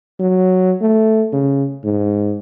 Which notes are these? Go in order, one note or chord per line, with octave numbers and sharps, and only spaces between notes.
F#3
A3
C#3
G#2